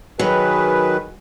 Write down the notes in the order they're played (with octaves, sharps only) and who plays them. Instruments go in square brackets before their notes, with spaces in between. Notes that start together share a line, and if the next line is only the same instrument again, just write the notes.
[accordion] D#3 B4 [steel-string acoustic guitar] F#3 [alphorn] G#4